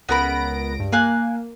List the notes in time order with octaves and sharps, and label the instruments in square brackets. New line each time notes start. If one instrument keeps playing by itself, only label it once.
[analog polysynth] C#2 A#6 D7 [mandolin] B3 A#4 B5
[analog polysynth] G2
[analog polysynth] A#3 [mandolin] F5 G#5 F#6